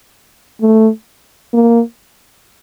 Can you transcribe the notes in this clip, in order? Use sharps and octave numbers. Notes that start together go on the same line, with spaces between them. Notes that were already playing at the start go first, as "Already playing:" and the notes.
A3
A#3